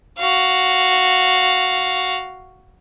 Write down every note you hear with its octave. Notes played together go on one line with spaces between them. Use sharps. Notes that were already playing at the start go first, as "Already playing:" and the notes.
F#4 F5